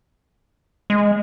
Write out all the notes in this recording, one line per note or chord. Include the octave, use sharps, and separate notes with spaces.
G#3